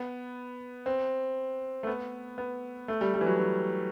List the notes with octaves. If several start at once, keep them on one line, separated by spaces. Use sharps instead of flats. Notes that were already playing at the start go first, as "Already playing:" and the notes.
Already playing: B3
C4
A3
B3
B3
A3
G3
G3
E3
F#3
E3